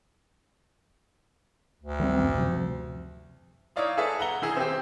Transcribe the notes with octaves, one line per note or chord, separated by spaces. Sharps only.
D2
D#3 G3 C4
A1 F#2
C3 F3
D#4 E4 C#5 D5 F5 D#6
G#4 A4 B4 E5 A5
F#5 A#5 G7
D#3 E4 G#4
C4 G4